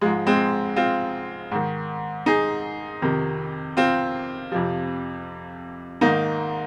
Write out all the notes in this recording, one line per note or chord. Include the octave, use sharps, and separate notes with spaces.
G#2 F3 G#3
G#3 C4
C4 F4
G#2 D#3
D#4 G#4
F2 C3 D#3
C4 F4
F2 C3 F3
G#2 D#3 A#3 D#4